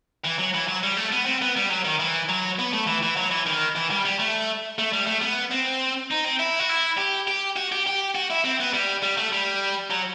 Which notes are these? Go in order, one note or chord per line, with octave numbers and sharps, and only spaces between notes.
E3
F#3
E3
F#3
G3
A3
B3
C4
B3
G3
F#3
D#3
E3
F#3
B3
A3
E3
E3
F#3
E3
D#3
E3
G3
G3
A3
A3
G3
A3
B3
C4
D#4
C4
E4
F#4
E4
G4
G4
F#4
G4
G4
F#4
E4
C4
B3
G3
G3
A3
G3
F#3